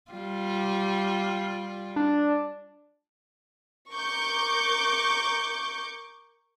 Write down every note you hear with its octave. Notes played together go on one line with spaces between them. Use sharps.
G3 F4
D4
A#4 C#6 D6 G6